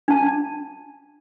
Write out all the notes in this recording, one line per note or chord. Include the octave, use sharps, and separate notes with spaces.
D4 A5